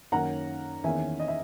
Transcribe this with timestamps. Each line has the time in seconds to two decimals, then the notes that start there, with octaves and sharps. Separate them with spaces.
0.12 F#2 D#3 A#3 C#4 F#5 A#5
0.84 E2 D#3 A#3 C#4 E5 G#5
1.20 D#5
1.28 E5